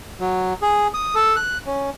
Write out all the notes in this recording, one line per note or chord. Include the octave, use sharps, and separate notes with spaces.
F#3
G#4
D#6
A4
F#6
C#4